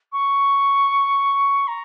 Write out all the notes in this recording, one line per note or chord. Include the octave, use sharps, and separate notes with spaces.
C#6
A#5